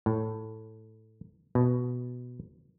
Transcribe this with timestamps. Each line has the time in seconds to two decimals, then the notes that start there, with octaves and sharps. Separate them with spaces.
0.06 A2
1.55 B2